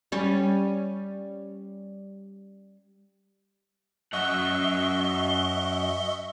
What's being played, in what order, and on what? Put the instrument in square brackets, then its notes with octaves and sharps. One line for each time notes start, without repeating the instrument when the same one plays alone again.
[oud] G3 C#4
[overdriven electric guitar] F#2 F#5 [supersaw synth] D#5 E5 C#6 [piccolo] G7